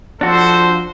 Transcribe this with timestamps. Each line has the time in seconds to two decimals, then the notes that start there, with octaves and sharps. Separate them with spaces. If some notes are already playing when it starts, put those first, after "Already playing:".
0.21 F3 D4 F#4 A4 C5